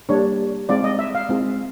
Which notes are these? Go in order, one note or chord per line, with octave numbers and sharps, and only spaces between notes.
G3 A#3 D4 C#5
G#3 C4 F4 D5
D#5
E5
F5
G#3 C4 F4